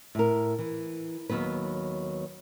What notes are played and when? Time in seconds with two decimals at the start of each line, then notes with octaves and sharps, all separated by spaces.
0.15 A2 A#4
0.59 E3
1.29 D#2 A#2 F#3 B3 B4